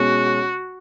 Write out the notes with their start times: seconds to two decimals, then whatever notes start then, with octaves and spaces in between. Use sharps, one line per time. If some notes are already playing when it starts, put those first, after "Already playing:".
Already playing: B2 G#3 C#4 F#4